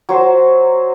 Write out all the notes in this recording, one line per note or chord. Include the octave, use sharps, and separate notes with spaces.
F#3 C5